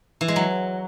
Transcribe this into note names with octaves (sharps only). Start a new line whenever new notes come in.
E3
G#3
F#3